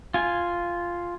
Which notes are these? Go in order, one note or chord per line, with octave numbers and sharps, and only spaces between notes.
F4 G#5